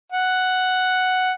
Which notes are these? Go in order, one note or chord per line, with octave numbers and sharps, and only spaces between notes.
F#5